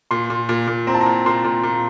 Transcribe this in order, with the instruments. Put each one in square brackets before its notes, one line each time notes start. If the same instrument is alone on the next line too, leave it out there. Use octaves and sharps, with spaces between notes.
[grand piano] A#2 [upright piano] C6
[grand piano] A#2
A#2
A#2
[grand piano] C4 [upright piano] A#5
[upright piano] A5
A#5
[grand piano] A#2
[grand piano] A#2 [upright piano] C6
[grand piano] A#2
A#2